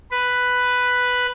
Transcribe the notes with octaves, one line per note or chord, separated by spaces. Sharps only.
B4